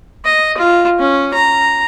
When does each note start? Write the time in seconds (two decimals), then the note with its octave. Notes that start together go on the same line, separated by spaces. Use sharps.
0.25 D#5
0.57 F4
0.99 C#4
1.34 A#5